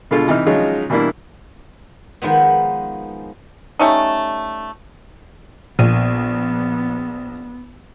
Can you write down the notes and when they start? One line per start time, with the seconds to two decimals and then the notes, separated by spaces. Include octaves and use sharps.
0.11 B2 D3 G#3 F4 A4
0.28 C3 E3 D#4 F6
0.47 F3 F#3 G#3 C#4 D#4 F4
0.90 B2 E3 G3 A#3 D4 E4
2.22 D#3 F3 G#3 B3
3.79 G3 A3 C#4 D#4
5.79 A#1 A#2 B3 D#7